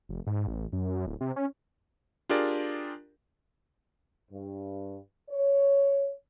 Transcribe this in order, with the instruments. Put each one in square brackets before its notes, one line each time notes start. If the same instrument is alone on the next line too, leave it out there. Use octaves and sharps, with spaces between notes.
[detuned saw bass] F1
G#2
A1
F#2
D1
C3
C#4
[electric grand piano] D4 F4 G4 G#4 A#4 D5
[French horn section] G2
C#5